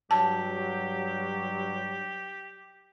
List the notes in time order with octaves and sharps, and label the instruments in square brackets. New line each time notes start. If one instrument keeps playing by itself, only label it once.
[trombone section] G2 F#3 [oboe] G4 [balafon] A5